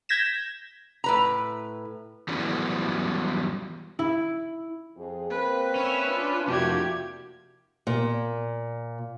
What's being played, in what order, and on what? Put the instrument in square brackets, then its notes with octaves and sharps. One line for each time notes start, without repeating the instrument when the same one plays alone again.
[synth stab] G6 G#6 A#6 B6 E7
[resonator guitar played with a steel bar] A2 B4 A#5
[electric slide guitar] E3 F#3 G3 B3 C#4 E4
[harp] E4
[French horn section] F2 G#4
[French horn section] A#3 C4 [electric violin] B4
[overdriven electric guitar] C#4 [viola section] C#5 E5
[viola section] D4 F4
[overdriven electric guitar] F2 C3 [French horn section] A#3 E4 F#4 [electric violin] G4 G#6
[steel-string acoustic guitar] A#2